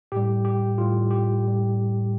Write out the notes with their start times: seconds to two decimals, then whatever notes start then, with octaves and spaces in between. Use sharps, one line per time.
0.12 A2 G3 G4
0.45 G4
0.77 A2 G3 F4
1.11 G4
1.43 A2 G3